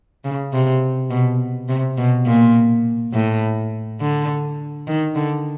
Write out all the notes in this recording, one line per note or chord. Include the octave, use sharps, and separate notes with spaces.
C#3
C3
B2
C3
B2
A#2
A2
D3
D#3
D3